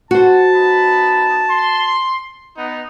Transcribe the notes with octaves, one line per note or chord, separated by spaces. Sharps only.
F#4 C5 A5
B3 D#4 B5
C6
B3 D#4